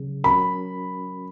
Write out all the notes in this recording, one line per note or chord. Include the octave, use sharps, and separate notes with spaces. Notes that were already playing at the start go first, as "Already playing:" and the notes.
Already playing: C#3 F#3 C#4 G#4
F#3 C#4 F#4 A#4 B5